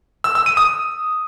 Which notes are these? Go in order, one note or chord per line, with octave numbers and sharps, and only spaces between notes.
E6
E6
D#7
D#6